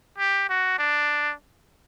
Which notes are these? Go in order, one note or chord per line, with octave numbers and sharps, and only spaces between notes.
G4
F#4
D4